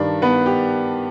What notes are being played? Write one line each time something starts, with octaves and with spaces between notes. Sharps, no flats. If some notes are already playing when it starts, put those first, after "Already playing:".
Already playing: G2 D#3 D4 D5
B3 B4
G4